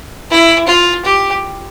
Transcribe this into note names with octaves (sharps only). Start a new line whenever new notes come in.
E4
F4
G4